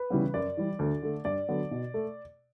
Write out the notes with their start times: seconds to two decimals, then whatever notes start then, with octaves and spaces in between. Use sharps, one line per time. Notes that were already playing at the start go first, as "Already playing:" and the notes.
Already playing: B4
0.10 C#3 E3 G3 B3
0.34 F#2 D5
0.57 E3 G3
0.79 D2
1.03 D3 A3
1.25 G2 D5
1.49 D3 F#3 B3
1.71 B2
1.94 A3